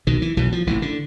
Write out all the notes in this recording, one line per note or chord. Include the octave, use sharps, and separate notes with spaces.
B1 B2 D#3
E3
B1 B2 E3
F3
A1 A2 E3
D3